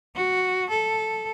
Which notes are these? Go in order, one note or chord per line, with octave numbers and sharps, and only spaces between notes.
F#4
A4